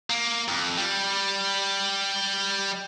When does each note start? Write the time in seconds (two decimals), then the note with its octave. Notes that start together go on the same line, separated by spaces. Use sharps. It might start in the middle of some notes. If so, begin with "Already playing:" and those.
0.10 A#3
0.48 F2
0.77 G3